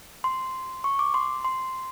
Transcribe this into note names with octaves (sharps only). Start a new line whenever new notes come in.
C6
C#6
D6
C6
C6